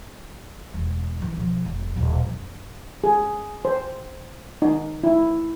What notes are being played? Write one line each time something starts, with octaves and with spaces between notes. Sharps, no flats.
E1
E3 D#4
B2 F3
F1
D#1 B1
F#1
G#4
C5
D#4
E4